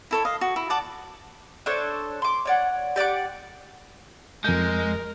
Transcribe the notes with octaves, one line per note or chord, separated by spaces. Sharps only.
E4 A4 C#5
D#5 F5
F#4
E4
D5 F#5 A5 D6
D4 A4 C5 C#5
C6 D6
C#5 D5 F#5
G4 D5 F#5 D6
F2 G#3 A#4 G6